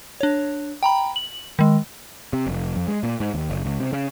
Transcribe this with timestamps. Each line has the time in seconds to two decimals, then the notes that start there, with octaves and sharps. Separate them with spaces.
0.21 D4 C#5
0.83 G5 A#5 B5
1.16 F#7
1.59 D#3 G#3
2.33 C3
2.47 F1
2.76 F2
2.88 G#3
3.03 A#2
3.20 G#2
3.34 D#2
3.50 F#1
3.64 C#2
3.80 C3
3.93 C#3